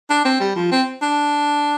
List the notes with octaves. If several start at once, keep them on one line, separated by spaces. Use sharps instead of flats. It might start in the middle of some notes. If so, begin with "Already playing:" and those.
D4
C4
G3
F3
C4
D4